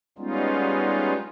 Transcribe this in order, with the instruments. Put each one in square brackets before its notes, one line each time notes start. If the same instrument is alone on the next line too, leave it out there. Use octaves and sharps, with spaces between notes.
[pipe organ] G3 G#3 B3 C#4 D#4 F4